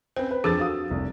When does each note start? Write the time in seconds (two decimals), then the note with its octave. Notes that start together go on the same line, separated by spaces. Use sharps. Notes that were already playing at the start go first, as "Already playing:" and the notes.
0.16 C4 C#4 B4 C5
0.31 B4
0.44 F2 D4 G#4 A4 E6 A6
0.59 F#4 F5 D#6
0.90 F1 C2